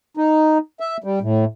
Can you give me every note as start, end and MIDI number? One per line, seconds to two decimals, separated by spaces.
0.17 0.58 63
0.80 0.97 76
1.04 1.19 55
1.22 1.44 45